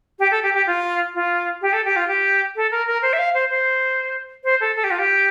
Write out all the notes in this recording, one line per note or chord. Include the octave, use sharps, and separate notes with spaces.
G4
A4
G4
G4
F4
F4
G4
A4
G4
F4
G4
A4
A#4
A#4
C5
E5
F5
C5
C5
C5
A4
A4
G4
F4
G4